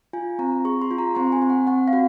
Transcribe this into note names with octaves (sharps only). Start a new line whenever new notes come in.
F4 G#5
C4 A#5
G#4 C#6
C6
F4
A#5
C4 C6
G#5
C4
F#5
C4 F#5
F5
F#4 F#5